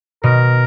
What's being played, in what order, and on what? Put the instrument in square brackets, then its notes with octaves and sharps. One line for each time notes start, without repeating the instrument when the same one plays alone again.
[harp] B2 [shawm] A#4